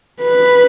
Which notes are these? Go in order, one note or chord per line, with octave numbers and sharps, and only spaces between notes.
B4